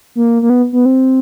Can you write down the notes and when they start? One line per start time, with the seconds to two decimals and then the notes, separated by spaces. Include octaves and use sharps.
0.15 A#3
0.42 A#3
0.50 B3
0.73 B3
0.85 C4